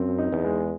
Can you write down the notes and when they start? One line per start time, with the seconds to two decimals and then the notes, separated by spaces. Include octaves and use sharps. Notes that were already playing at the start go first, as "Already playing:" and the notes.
Already playing: F#2 C4
0.18 D#4
0.32 E2
0.44 G#3